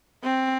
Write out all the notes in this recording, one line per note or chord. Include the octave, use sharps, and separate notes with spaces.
C4